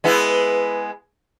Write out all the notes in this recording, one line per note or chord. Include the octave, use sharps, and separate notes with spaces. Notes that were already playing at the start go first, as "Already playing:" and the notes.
G#3 B3 E4